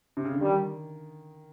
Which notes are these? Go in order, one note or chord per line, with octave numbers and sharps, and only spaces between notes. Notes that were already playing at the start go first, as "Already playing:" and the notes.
C3
C#3
D3
D#3 G3